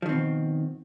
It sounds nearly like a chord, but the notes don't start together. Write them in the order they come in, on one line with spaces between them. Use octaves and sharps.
F3 D#3 C4 B2